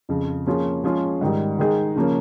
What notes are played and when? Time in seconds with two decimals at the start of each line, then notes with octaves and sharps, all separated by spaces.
0.09 F2 C#3 F3
0.47 F3 A#3 C#4 F4 G#4
0.84 F3 G#3 C#4 F4 G#4
1.21 G#2 D#3 G3
1.59 D#3 G#3 D#4 G#4
1.96 C#3 F3 A#3 C#4